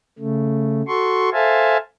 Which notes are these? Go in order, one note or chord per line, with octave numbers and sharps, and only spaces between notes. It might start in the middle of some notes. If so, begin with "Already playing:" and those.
C#3 A3
F#4 A4 C6 C#6
A4 C5 E5 F5 G#5 A5